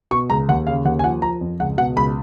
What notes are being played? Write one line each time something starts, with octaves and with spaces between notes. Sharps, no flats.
B2 C#6
C#2 A#5
D#2 F#5
C#3 F5
D#2 F#5
G#5
F3 F#5
F3 A#5
F2
C#2 F#5
B2 F#5
C#2 B5